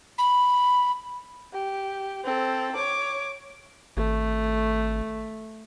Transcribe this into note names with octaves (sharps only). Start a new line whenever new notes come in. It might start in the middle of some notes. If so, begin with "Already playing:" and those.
B5
G4
C4 A4
C#5 D6
G#1 A3